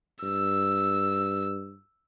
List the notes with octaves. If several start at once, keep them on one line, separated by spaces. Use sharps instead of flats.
G2 E6